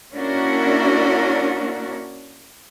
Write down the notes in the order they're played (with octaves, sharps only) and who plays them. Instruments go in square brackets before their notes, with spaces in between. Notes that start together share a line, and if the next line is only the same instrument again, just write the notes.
[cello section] A#3 C#4 D4 E4 F#4 A#4